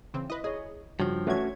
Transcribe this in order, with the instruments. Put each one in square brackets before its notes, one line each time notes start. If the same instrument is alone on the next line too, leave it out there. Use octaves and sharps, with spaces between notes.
[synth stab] C#3 E3 C4
[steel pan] E4 [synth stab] B4 D#5
[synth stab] G#4 [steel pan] C#5 D#5
[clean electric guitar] G2 F3 [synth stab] C#3 [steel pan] F#4 C#5
[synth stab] E3 G#6 [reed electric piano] A3 C#4 F#4 [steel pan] C#5 E5 G#5